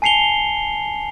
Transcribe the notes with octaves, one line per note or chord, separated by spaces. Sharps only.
G#5 A5 C7 C#7 F7 G7